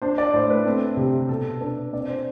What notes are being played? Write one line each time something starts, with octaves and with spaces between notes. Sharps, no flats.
D4 C5
D5
A2 C5
B4
C4 A4
C3 G4
B2 A4
D4 B4
C4 D5
C5